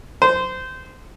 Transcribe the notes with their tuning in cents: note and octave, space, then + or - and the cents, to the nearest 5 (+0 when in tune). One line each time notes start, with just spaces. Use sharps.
C5 -20